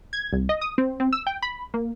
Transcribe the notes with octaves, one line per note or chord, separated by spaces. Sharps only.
G#6
C2
D#5
D#6
C4
C4
E6
G5
B5
A#3